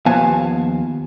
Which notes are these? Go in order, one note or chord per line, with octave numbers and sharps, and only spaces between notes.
D#2 F3 B3 F5 G#5 A5